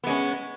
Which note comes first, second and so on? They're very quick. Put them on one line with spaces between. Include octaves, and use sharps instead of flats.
B3 G#3 C#4